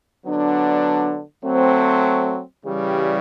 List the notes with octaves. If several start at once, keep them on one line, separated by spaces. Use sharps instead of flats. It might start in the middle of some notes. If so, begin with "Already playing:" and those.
D3 F#3 B3 D4
F#3 A3 C4
C#3 E3 G3